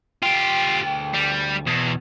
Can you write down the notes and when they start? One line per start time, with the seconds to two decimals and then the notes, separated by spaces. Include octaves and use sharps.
0.23 D2 F4 G4 G5
1.14 G3
1.67 E2 B2